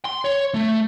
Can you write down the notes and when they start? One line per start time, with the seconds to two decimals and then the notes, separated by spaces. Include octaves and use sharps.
0.05 C6
0.25 C#5
0.54 A3